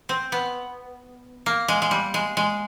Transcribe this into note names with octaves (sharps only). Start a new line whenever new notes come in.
C4
B3
A#3
G#3
G#3
G3
G#3
G#3